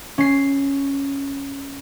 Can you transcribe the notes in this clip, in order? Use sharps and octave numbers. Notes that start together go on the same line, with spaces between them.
C#4 C7